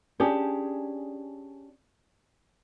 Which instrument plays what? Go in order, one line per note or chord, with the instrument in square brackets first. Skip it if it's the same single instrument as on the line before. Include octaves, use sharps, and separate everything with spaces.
[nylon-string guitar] C#4 D4 G4 G#4